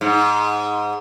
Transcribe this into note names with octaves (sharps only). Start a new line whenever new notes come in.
G#2